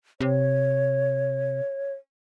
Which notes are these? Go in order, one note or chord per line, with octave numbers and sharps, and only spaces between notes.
C3 C#5